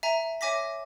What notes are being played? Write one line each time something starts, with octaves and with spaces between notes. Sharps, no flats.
E5 G#5 A#5
C#5 E5 G#5 D6 A#6 B6